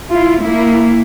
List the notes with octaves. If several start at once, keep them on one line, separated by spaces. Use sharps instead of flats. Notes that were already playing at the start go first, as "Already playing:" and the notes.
E4 F4
A#3 E4